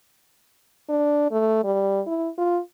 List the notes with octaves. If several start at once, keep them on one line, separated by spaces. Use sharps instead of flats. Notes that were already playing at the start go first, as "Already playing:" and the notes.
D4
A3
G3
E4
F4